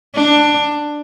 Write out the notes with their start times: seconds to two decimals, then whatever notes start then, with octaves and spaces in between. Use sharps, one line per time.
0.15 D4